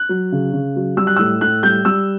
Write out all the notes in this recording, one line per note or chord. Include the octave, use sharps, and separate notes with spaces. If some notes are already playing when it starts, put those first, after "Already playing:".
Already playing: F#6
F#3
C#3
C#3
F#3
G3 E6
F#6
A2 E6
A2 F#6
G3 G6
G3 E6